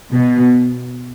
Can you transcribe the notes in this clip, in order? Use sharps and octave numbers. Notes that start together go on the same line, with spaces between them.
B2